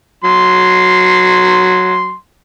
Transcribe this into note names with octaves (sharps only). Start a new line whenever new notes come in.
F#3 C6